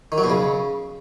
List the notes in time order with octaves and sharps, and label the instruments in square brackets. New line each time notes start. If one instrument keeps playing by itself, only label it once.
[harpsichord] D#3
F#3
B2
C#3